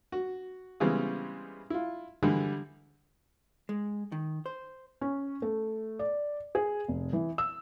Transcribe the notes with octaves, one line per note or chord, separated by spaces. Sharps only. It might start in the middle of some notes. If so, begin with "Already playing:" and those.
F#4
C#3 E3 G3 G#3 B3 C4
E4 F4
D3 E3 G3 G#3 E4
G#3
D#3
C5
C#4
A3
D5
G#4
F1
E3
E6